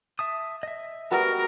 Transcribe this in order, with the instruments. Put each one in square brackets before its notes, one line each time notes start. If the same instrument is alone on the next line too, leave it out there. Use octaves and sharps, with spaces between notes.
[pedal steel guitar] E5 A5 D#6
D#5 E5
[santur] G3 B3 F#4 [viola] A#4